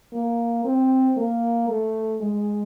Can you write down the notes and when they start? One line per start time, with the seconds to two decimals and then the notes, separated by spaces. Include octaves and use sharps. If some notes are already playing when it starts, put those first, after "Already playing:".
0.13 A#3
0.64 C4
1.17 A#3
1.68 A3
2.21 G#3